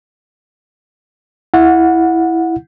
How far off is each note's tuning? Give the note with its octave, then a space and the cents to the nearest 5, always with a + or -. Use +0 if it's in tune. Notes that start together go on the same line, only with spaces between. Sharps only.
E4 +0 F#5 -20